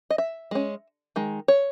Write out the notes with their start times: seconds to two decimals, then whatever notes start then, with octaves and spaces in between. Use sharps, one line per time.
0.10 D#5
0.18 E5
0.51 G#3 C#4
1.16 D#3 G#3
1.48 C#5